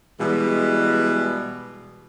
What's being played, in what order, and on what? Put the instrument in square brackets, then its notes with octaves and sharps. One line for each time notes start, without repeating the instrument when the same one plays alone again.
[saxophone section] B2 E3 G3 G#3